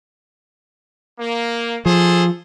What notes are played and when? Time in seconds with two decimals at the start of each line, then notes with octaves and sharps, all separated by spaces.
1.19 A#3
1.86 F3 G#4 A4 C5